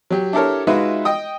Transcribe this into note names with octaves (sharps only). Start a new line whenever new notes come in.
F#3 G4
D4 E4 G4 A4 A#4 C#5
G#3 D#4 F4 F#4 B4 E5
D#5 G5 D#6